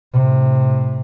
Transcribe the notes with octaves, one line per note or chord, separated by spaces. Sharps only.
A2 C3